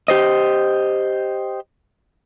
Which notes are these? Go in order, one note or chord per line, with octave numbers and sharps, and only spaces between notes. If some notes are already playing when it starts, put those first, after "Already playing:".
G4 C5 D#5